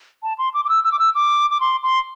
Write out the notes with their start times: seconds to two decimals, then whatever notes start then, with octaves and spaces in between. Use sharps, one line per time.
0.23 A5
0.38 C6
0.54 D6
0.65 D6
0.69 E6
0.84 E6
0.92 D6
0.99 E6
1.15 D6
1.50 D6
1.60 C6
1.83 C6